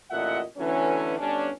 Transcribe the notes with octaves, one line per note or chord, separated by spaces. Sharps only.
A1 A#2 D3 D#5 E5 F#5
D3 E3 F#3 A3 B3 C#4
G1 C#4 D4